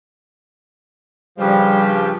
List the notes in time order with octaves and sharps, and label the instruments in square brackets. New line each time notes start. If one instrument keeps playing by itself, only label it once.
[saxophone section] G2 C#3 F3 [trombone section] G3 [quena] G4